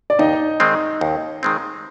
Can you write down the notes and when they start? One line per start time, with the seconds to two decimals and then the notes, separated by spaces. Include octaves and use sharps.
0.10 D5
0.19 D#2 D#4 D#5
0.60 D#3 G#3 C4
1.01 D#2
1.43 D#3 G#3 C4